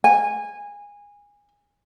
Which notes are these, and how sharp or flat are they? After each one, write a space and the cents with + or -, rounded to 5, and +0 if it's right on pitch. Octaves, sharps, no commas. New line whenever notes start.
G#5 -20